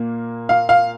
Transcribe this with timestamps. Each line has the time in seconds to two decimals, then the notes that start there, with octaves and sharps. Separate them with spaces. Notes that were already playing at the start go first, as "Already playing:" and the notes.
Already playing: A#2 A#3
0.49 F5
0.69 F5